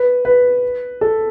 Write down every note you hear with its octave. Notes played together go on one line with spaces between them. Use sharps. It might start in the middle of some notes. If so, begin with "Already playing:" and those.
Already playing: B4
B4
A4